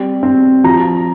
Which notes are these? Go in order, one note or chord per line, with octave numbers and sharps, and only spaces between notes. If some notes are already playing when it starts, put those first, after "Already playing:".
Already playing: G3 C4
C4
F3 A#5